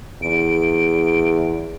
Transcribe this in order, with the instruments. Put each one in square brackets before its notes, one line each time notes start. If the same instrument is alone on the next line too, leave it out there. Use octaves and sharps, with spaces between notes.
[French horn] E2 [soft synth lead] D7